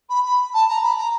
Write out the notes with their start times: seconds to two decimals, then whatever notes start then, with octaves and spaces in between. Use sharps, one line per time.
0.09 B5
0.24 B5
0.53 A5
0.68 A#5
0.83 B5
0.97 A#5